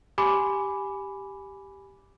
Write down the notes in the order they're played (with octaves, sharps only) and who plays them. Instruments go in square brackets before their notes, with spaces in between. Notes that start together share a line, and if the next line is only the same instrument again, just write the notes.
[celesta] G4 G#5 B5 D6